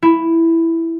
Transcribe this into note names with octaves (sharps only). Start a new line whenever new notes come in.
E4